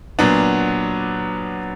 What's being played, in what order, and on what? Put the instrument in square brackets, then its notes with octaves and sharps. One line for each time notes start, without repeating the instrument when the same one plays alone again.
[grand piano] A#2 F#3 B3 D4